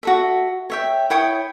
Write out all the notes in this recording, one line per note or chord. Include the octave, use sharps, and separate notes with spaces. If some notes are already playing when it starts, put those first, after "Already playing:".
F#4 A4 E5
C#5 E5 G5
E4 C#5 G5 D#6